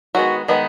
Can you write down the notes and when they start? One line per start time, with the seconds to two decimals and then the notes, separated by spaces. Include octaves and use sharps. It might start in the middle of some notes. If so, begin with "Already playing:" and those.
0.15 D#3 G#3 B3 F#4
0.48 D#3 G#3 B3 D#4